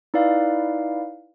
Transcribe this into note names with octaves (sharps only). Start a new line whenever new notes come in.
D#4 E4 B4 D5 F5